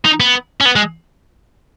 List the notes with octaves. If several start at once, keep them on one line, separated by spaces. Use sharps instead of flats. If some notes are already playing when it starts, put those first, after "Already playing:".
D#4
B3
C#4
B3
G#3